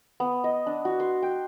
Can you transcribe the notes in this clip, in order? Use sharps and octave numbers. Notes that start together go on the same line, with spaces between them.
B3
D#5
D4
F#4
C6
G5